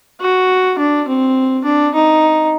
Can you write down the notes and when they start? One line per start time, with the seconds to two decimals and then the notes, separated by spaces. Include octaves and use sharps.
0.21 F#4
0.79 D4
1.08 C4
1.65 D4
1.95 D#4